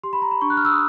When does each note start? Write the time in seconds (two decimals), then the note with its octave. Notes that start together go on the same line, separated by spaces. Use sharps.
0.04 G4 C6
0.13 B5
0.22 A#5
0.31 B5
0.41 D4 C#6
0.50 F#6
0.57 F6
0.65 E6
0.72 D#6